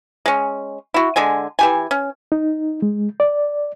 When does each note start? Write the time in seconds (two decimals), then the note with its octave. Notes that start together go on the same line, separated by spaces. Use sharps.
0.26 G#3 C#4
0.94 E4 F#4
1.16 D3 G#3 G#5
1.59 E3 G4 G#5
1.91 C#4
2.32 D#4
2.82 G#3
3.20 D5